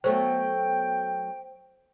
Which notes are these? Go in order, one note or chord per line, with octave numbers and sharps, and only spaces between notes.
F#3 A3 B3 C5 G5